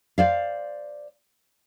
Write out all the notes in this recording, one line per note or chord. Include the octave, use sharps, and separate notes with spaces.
C5 D5 F5